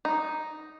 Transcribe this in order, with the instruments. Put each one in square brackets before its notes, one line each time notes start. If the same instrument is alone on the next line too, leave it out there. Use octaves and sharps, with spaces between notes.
[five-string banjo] D#4